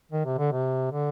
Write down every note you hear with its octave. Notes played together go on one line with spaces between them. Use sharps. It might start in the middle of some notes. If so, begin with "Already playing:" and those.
D#3
C3
D3
C3
D3